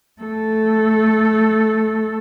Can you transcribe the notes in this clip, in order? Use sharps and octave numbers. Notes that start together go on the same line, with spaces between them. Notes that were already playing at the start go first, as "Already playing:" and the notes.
A3 A4